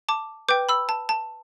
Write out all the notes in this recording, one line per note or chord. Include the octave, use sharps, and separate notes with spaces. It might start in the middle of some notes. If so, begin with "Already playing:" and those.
A5 D6
B4 G5 D6 G6
B5 E6
A5
A5